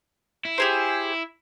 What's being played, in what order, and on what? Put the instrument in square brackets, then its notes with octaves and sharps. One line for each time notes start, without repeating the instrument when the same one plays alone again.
[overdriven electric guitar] E4
[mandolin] G4 G#4 C5